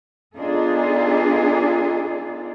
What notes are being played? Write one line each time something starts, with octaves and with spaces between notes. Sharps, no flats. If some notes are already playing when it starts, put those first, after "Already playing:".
B3 D4 D#4 F4 G#4 A4